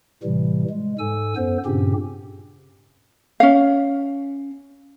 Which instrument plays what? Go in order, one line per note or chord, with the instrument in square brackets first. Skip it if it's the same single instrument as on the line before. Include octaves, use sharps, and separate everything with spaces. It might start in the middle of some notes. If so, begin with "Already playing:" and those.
[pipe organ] A2 C3 E3 G3
G#3
G#2 A4 G#5 E6
F#2 B3 A4 C5
G2 A#2 C#3 C4 C#4 G4
[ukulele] C#4 F5